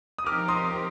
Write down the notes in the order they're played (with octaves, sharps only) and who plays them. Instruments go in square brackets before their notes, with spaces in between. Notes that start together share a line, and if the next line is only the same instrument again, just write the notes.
[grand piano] D#6
[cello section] F3 C4 D#4 G4 A#4 [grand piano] D6 F6
[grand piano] C6 D#6